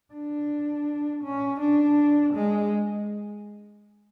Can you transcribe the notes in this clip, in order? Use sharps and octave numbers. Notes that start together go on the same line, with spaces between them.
D4
C#4
D4
G#3